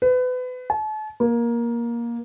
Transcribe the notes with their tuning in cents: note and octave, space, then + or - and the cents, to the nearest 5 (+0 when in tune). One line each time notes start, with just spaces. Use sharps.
B4 +30
A5 -40
A#3 +15